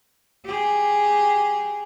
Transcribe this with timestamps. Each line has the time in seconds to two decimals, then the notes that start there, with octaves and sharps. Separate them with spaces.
0.45 G4 G#4